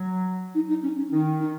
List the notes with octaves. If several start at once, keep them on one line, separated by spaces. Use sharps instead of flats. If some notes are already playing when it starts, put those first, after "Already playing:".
Already playing: F#3
D#4
D#4
C#4
C#4
D#3 D#4
D#4